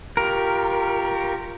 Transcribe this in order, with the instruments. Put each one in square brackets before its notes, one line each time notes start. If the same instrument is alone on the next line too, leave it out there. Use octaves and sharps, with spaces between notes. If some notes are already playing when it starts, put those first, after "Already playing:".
[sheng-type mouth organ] F4 G4 C#6 [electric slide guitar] A#4